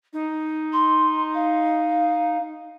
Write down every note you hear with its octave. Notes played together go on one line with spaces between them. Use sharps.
D#4
C6
F5